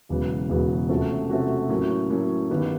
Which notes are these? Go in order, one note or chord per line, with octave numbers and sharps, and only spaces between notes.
E1 E2 C#3 F#3 B3
E1 E2 C#3 F#3 B3
C3 F3 A3 C#4 F#4
C3 F3 A3 C#4 F#4
A2 F#3 A#3 C#4
A2 F#3 A#3 C#4
G2 D#3 G3 B3